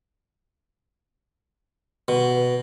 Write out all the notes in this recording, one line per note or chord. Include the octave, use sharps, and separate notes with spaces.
B2